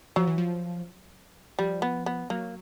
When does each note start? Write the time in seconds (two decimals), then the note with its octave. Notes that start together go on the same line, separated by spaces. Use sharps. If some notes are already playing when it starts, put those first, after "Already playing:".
0.16 F3 F#3
0.27 E3
0.38 F3
1.59 F3 G3
1.82 B3
2.06 B3
2.30 F#3 A#3